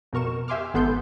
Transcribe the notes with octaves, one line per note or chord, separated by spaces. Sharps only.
F2 B2 A#4 C#6 E7
G4 E5 G#5 C6 D6 F6
G#1 B3 A4 C6 G6